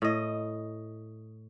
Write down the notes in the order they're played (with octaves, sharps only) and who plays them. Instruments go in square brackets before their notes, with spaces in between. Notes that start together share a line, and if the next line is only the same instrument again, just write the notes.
[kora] A2 D#5